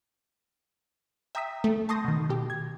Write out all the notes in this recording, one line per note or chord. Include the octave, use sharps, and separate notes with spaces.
E5 G5 A#5 D#6 E6 B6
A3
A5 C6 C#6 D#6 G6 A#6
B2 D#3
B2 G4
G#6